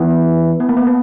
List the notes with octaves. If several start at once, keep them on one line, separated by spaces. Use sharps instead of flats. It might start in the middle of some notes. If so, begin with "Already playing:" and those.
Already playing: E3 B3
B3
A#3
B3
B3